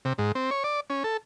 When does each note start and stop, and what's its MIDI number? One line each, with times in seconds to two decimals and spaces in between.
0.05 0.13 48
0.18 0.32 44
0.35 0.50 60
0.51 0.63 73
0.64 0.80 74
0.90 1.03 61
1.04 1.17 69